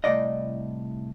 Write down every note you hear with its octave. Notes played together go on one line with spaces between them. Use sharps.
C2 A2 D5 D#5